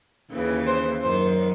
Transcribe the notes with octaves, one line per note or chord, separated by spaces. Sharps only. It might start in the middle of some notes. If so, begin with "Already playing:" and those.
D#2 C#3 E3
C5
F#2 D#3 C5